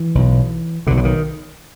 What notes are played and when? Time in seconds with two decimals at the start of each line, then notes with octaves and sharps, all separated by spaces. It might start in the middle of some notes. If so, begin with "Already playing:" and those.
Already playing: E3
0.15 B1 B2
0.87 B2 D3
0.90 B1
0.97 D3
1.05 D#3